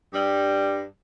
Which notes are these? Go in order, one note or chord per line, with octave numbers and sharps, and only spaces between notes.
G2 G3